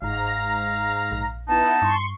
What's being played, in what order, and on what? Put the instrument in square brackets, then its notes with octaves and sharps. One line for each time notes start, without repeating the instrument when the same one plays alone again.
[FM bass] G1 [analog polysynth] G#2 A#5 A#6 [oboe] F5
[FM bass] A#1
[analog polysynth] B3 E4 [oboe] D#4 [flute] A5
[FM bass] G2 [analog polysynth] C6 C#6